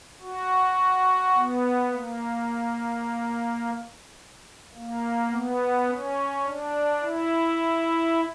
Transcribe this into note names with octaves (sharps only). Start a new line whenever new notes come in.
F#4
B3
A#3
A#3
B3
C#4
D4
E4